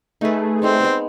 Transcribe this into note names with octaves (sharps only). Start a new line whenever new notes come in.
A3 D#4 G#4 B4
G3 G#3 C4 D#4
G#3 B3